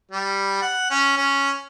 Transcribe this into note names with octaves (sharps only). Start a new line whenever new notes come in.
G3
F#5
C#4
C#4